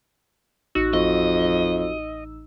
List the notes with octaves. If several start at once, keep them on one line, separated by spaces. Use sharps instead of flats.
A1 D#4 F#4 E6
F2 D#5